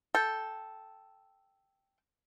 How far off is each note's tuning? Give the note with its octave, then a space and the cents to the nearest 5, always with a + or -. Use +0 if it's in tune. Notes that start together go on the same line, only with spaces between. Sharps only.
A4 -5 G5 +0